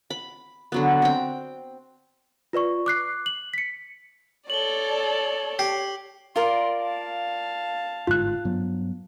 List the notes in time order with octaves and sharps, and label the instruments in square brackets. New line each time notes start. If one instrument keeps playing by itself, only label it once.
[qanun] B5
D3 F#3 B3
C4 G5
[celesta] F4 B4 D5 C#6
D6 F#6 C7
F#7
B6 C#7
[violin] A4 D5 [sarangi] C#5 [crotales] F#7 G7
[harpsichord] G4 [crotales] C7
[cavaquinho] F4 A#4 D5 [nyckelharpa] C6
[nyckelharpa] F5 A5
[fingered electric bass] G1 G#2 [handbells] F4 F#6
[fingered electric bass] G2 F#3 B3